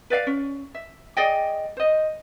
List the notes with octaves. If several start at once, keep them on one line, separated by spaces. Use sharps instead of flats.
B4 D5 E5 F5
C#4
E5
G#4 D5 D#5 G5
C5 D#5